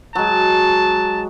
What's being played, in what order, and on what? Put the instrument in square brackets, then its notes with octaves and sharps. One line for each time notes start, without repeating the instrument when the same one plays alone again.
[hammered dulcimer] F#3 G#3 [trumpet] A5